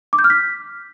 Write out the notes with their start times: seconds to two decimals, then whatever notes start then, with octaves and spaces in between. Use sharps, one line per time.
0.13 D6
0.19 G6
0.24 F6
0.30 B6